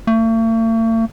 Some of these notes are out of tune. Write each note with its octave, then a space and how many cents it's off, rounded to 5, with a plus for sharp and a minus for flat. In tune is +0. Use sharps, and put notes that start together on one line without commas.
A3 +45